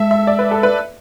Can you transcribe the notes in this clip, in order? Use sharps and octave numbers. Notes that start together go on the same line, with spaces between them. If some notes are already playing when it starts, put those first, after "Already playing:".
Already playing: G#3 A4 E5
E5
D5
B4
A4
B4